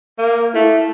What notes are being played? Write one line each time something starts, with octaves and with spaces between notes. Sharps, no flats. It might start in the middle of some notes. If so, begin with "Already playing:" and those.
A#3
A3 E4